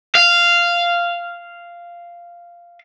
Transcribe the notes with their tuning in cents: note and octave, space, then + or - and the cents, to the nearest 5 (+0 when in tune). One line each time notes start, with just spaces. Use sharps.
F5 -10